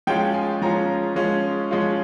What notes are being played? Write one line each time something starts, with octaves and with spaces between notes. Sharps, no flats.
F3 G#3 C#4 F4 G5
G#5
F3 G#3 C#4 F4 A#5
F3 G#3 C#4 F4
F3 G#3 C#4 F4